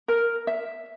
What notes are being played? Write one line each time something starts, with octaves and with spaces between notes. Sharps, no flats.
A#4
E5